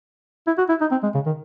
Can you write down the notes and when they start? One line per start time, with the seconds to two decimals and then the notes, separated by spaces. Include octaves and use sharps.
0.47 E4
0.58 F#4
0.69 E4
0.81 D#4
0.91 C4
1.03 G#3
1.15 C#3
1.26 D#3